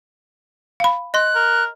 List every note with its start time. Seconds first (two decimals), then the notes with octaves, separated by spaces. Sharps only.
0.80 F5 B5
1.14 D#5 C6 F#6
1.35 A#4